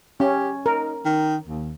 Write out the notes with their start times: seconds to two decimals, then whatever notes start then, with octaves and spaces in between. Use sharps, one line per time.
0.20 C#4 G4
0.66 D#4 A#4
1.05 D#3
1.47 D#2